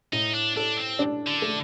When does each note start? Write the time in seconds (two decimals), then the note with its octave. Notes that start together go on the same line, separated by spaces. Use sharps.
0.13 A2 D#4
0.34 D4
0.57 D4 A4
0.77 C4
0.99 D4
1.27 D3
1.42 A3